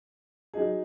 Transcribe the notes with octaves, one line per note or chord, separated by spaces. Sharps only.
F#3 D#4 G#4